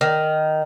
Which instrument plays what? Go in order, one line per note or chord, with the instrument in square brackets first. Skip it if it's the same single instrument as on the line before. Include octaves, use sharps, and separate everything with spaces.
[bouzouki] D#3